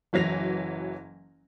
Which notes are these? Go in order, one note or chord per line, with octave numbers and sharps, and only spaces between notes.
F#1 E3 F#3 A#6 F7